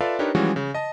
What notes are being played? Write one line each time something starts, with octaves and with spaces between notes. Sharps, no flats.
F4 A4 B4 D5 E5 F5
D4 D#4 G4 A#4 B4 C#5
E3 F3 G3 G#3 C#4 F#4
C#3
D#5 A5